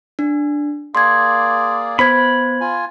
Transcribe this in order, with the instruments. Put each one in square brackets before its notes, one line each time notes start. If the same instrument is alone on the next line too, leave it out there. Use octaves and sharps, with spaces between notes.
[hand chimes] D4
[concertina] A#3 G#4 D5 [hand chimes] C6 G#6
[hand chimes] B3 C5 G#6 [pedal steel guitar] B5
[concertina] F4 G#5